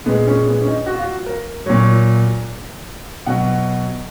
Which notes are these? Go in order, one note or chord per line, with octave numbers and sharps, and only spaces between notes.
A#2 G#3 B3
C#4
B3
C#4
D#4
F#4
F4
F#4
A#4
A#2 F#3 C#5
B2 F#3 F#5